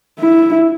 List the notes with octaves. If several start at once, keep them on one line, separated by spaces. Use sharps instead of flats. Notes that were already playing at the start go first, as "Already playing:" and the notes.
E4